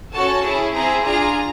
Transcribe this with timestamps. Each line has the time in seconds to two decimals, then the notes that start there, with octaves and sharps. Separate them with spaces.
0.13 C#4 F#4 A4 A5
0.44 C#4 E4 G#4
0.73 C4 E4 G#4 A#5
1.04 D4 F4 G#4 A#5